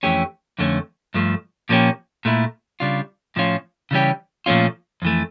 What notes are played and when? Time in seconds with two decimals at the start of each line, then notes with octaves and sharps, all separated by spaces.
0.03 F2 E3 A3 C#4 G4
0.58 F2 D3 A3 C#4
1.14 G2 F3 A3
1.69 A#2 F3 A#3 C#4 G4
2.25 A#2 A3 E4
2.80 C#3 G3 D4 F4
3.36 A2 F3 C#4 F4
3.91 C#3 E3 G3 C#4 G4
4.46 A#2 F3 A3 C#4 F4
5.02 F2 E3 A3